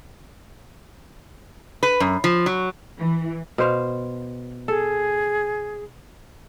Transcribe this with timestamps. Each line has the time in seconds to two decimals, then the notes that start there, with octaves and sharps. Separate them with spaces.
1.83 B4
2.00 F#2
2.24 F3
2.46 F#3
2.98 E3
3.58 B2 C5 F5
4.68 G#4 A4